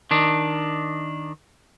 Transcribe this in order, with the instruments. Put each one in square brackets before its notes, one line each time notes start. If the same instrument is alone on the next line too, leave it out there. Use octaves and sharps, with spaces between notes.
[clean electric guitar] D#3 D4